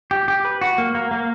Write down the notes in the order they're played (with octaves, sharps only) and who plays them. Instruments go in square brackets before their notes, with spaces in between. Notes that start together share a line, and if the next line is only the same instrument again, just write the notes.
[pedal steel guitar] G4
G4
B4
F#4
A#3
A#3
A#3